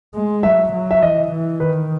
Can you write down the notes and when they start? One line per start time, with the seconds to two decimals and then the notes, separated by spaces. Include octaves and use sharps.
0.15 G#3
0.43 F#3 E5
0.73 F#3
0.91 E5
1.02 E3 D#5
1.32 E3
1.60 D#3 B4